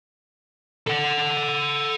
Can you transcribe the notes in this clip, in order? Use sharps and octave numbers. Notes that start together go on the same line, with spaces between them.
A4 F#5